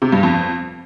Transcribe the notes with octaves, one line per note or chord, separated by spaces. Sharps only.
C3
G2
F2